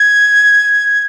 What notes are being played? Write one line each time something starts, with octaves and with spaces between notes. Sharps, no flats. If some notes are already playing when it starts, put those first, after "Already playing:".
Already playing: G#6